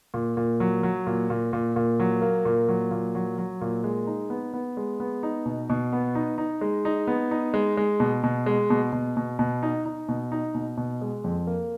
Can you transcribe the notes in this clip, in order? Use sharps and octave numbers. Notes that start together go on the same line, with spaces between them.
A#2
A#2
F#3
F#3
A#2
A#2
A#2
A#2
F#3
A#3
A#2
F#3
A#2
F#3
F#3
A#2
G#3
D#4
B3
B3
G#3
B3
D#4
B2
B2
B3
D#4
D#4
G#3
D#4
B3
D#4
G#3
G#3
B2
B2
G#3
B2
B2
B2
B2
D#4
D#4
B2
D#4
B2
B2
G#3
F2
A#3